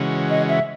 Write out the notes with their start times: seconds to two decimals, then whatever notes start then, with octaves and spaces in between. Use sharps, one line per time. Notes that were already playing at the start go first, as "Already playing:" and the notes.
Already playing: C#3 E3 G#3 C#4 F#4
0.30 D#5
0.49 E5